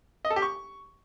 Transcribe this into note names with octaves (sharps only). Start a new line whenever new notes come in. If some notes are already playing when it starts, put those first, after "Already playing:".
D#5
A4
G4
C#6